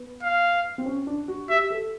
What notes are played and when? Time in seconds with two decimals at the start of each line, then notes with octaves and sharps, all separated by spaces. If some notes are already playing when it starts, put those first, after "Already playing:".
Already playing: B3
0.23 F5
0.78 C4
0.86 C#4
1.07 D4
1.28 F#4
1.49 G4 E5
1.70 A4